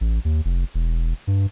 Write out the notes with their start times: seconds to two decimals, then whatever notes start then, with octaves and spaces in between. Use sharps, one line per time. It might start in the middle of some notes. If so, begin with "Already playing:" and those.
0.01 A1
0.25 D#2
0.45 F1
0.74 E1
1.27 G2